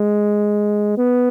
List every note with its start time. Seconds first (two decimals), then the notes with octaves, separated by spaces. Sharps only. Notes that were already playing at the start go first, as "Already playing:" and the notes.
Already playing: G#3
0.98 B3